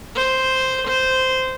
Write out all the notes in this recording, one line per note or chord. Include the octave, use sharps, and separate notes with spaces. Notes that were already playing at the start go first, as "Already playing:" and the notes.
C5
C5